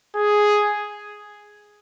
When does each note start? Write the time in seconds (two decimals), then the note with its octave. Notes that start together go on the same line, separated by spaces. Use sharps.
0.15 G#4